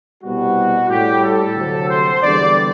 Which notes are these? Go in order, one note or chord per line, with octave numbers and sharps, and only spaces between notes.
C2 B2 G3 F#4
A2 G3 G4
A4
D2 C3 F#3
C5
E2 D3 G3 D5